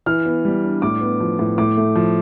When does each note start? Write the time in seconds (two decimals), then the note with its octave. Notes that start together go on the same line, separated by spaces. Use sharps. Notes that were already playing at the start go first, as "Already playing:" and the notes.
0.06 E3 F6
0.25 B3
0.45 G3
0.63 D4
0.82 A2 D6
1.01 B3
1.20 F3
1.39 A2
1.58 A2 D6
1.77 A3
1.96 F3